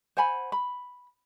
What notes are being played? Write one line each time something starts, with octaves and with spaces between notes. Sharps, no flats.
C5 F#5 G#5 B5
B5